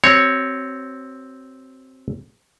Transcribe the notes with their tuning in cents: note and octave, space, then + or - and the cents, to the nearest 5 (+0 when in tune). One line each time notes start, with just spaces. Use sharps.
C4 +0 F#4 +40 C#5 +0